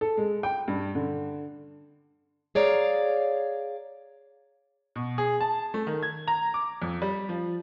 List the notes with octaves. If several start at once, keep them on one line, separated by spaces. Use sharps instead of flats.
A4
G#3
G5
G2
D3
G#4 C#5 D5 F5 A#5
B2
G#4
A5
A3
D#3
G#6
A#5
D6
F2
G3
F3